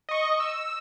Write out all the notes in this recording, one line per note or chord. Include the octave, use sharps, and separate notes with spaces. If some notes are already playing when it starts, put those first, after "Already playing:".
D#5 C#6
E6